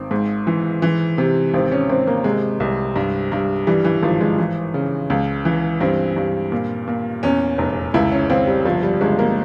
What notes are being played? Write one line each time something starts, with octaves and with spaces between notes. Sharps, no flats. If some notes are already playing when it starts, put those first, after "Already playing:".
Already playing: G#1 C4
G#2
E3
E3
C3
G#1 C4
C#4
G#1 C4
A#3
C3 G#3
C2
G2
G2
E3 G3
E3
G#1 F3
G#3
E3
C#3
C#2
E3
G2 C4
G2
A#2
A#2
E2 C#4
F1
C#2 E4
C#4
C#2 C4
G3
G1 F3
G3
G1 G#3
A#3